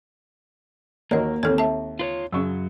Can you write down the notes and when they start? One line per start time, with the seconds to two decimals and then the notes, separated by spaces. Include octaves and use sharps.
1.11 D#2 A#3 F#4 A#4 C#5 D#5
1.43 D#2 C4 A4 C#5
1.58 E5 A5
1.99 F4 B4 C#5
2.32 F#2 C#3 F#3 C#6 E6